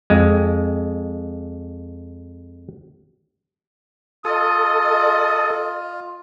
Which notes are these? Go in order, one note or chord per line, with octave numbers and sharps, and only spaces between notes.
F2 G#3
F4 A4 D#5 D#6